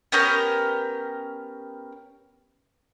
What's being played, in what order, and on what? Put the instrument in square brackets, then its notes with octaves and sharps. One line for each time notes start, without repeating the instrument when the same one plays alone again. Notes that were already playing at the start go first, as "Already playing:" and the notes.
[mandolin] B3 C#4 G4 A#4